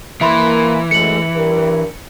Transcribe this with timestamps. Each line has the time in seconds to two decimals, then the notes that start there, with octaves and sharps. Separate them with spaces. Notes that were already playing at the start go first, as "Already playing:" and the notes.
0.21 E3 A#3 E5 B5 C6
0.91 F#2 G#3 A3 C#7 F#7
1.36 G2 A#4